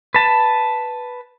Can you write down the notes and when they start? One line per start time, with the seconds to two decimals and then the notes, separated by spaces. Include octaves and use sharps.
0.14 B4 A5